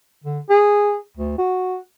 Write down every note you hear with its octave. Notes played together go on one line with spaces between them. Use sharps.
D3
G#4
D2
F#4